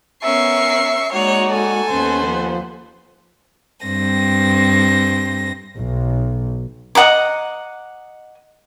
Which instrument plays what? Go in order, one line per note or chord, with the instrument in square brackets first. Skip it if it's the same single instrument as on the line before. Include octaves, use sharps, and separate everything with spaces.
[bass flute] B3 [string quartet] C#4 A#4 [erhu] E5 [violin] C#6 C7
[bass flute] G#3 [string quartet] A#3 D#4 D5 [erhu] F#4 [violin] C#5
[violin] A4 G#5
[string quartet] D#2 B3 [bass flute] C#4 [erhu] C5
[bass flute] F3
[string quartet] G2 C4 A#6
[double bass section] B1
[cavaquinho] D#5 F#5 A#5 D6